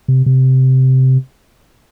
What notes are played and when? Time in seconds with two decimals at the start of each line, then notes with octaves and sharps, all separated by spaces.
0.08 C3
0.26 C3